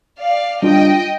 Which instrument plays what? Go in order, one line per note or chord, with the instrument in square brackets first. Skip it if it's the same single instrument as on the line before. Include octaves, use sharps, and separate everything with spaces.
[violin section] D5 F5
[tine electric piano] G3 D4 F4 [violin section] D#5 G5